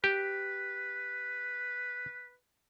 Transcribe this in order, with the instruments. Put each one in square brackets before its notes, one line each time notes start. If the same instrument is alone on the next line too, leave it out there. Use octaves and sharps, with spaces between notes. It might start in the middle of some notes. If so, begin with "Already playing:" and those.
[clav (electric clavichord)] G4 [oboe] B4